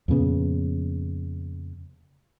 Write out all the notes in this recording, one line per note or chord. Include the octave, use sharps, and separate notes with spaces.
F2 A#2 C#3 B3